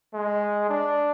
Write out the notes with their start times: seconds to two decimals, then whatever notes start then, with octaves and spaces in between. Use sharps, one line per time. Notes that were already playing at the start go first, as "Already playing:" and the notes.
0.13 G#3
0.69 D4